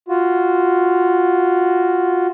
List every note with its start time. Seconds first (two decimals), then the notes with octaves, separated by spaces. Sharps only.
0.08 F4 F#4